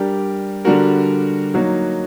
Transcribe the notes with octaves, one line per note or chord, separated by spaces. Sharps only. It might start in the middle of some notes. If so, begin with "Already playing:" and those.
Already playing: G3 D4 G4 A#4 D5
D3 G3 D4 F#4 A#4
F#3 A#3 D#4 F#4